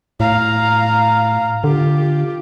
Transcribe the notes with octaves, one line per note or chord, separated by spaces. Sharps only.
A2 F5 A#5
D3 F4 G4